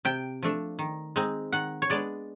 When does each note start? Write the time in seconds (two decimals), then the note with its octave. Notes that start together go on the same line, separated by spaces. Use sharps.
0.05 C3 G5
0.43 F3 A3 D4
0.79 D#3
1.16 G#3 C4 D#4
1.52 D#3 F#5
1.82 C#5
1.90 G#3 B3 D4 D5